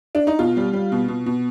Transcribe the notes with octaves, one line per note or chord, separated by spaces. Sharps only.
D4
D#4
B2 F4
G3
G3
B2
B2
B2